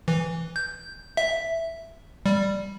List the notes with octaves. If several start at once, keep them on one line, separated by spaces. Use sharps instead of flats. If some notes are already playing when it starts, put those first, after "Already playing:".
E3
G6
E5
G3